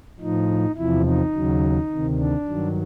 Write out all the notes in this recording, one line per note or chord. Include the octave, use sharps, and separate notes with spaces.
A2 F3 D#4
E2 C3 F3 E4
D#4
D#2 C#3 F#3
D2 C3 D#3
D4
G2 D#3 F#3